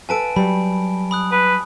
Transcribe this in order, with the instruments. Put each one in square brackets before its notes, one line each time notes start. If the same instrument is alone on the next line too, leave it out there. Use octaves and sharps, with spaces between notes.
[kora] A4 B4 F5 [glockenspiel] G#5 A5 D7
[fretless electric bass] F#3 [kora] G3 [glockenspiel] B5
[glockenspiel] B5 D#6 F#6
[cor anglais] B4